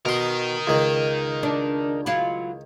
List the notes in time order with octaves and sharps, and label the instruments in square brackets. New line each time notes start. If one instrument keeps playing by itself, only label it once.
[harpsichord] B2 C6 [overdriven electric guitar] A#4 D#5
[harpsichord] C#2 D#3
[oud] D4
F#3 E4 F4